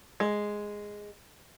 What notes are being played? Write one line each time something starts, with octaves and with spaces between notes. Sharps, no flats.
G#3